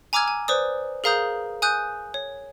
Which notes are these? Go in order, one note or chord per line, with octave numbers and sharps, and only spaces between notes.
G#5 A#5 D6 E6 F6 G#6
G#5
B4 C5 D5 D#6
G#4 A#4 F5 A#5 D#6 G6
G#5 D#6 F#6 G6
C#5